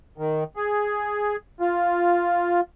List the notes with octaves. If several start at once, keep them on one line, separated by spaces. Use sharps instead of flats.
D#3
G#4
F4